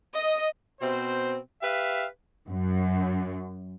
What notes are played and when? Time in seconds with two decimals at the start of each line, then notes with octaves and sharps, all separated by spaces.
0.14 D#5
0.81 B2 C4 C5
1.62 G4 B4 E5 F5
2.48 F#2